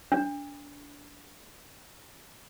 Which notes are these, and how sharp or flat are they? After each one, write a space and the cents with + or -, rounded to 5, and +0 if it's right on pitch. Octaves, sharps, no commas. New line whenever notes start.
D4 -25